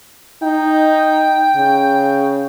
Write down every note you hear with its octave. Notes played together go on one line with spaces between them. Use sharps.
D#4 G5
C#3